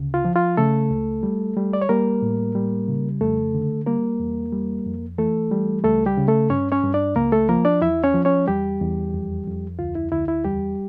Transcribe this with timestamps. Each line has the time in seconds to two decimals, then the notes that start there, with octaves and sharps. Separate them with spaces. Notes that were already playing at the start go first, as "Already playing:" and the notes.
Already playing: D2 C#3
0.14 F4
0.25 F3
0.36 F4
0.57 C#3 A3 A4
0.91 C#2
1.23 G3
1.57 G3
1.73 D5
1.82 C#5
1.89 G3 A#3 A#4
2.22 A2
2.55 G3
2.88 C#3
3.21 F2 A3 A4
3.54 D3
3.86 G3 A#3 A#4
4.20 E2
4.52 G3
4.85 F2
5.18 E3 A3 A4
5.52 G3
5.84 C#2 A3 A4
6.06 G3 G4
6.18 C#3
6.28 A3 A4
6.50 G2 C#4 C#5
6.72 C#4 C#5
6.83 G2
6.94 D4 D5
7.16 C#2 A#3 A#4
7.32 A3 A4
7.49 F3 A#3 A#4
7.65 D4 D5
7.82 E2 E4 E5
8.04 C#4 C#5
8.14 F3
8.25 C#4 C#5
8.47 E2 G3 G4
8.81 E2
9.14 F2
9.47 F2
9.79 D2 F4
9.95 E4
10.12 D2 E4
10.28 E4
10.45 E2 G3 G4